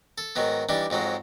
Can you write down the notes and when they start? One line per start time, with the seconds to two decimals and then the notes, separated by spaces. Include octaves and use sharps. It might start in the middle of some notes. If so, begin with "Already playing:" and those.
0.18 A4
0.36 G#2 D#3 F#3 B3
0.69 E3 G3 D4 D#4
0.90 F2 G#2 F#3 G#3